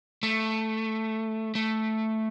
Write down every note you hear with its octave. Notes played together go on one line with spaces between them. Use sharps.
A3
A3